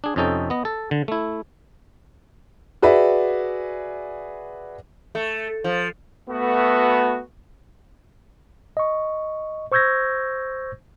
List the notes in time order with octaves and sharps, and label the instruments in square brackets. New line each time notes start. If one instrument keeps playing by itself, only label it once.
[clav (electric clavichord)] D4 G#4
F2 C3 C#4 D#4 A4 G5
B3 D#5
A4
D3
A3 E4
[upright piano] F#4 G#4 B4 D5 E5
[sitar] A3
F3
[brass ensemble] A3 B3 F#4
[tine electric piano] D#5 C#6
C5 C#6 E6 G6 G#6 A#6